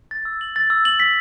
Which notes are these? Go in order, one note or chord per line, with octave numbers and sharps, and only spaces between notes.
A6
E6
F#7
A6
E6
F#7
B6